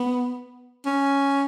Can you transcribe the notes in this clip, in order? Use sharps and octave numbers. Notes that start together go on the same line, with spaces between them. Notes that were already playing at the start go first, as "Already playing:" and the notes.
Already playing: B3
C#4